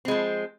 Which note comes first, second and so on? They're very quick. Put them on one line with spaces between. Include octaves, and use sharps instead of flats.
C4 G#3 F3